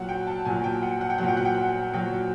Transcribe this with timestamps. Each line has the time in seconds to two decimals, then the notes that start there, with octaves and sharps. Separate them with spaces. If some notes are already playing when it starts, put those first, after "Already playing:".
Already playing: A#2 F#3 F#5
0.09 G5
0.27 A5
0.45 A#2 F#3 G#5
0.64 G5
0.83 F#5
1.01 F#5
1.10 G5
1.18 A#2 F#3 F#5
1.28 G5
1.37 F#5
1.45 G5
1.55 F#5
1.93 A#2 F#3 G5